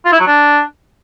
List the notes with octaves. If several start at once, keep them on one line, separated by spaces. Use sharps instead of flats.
F4
E4
F#3
D4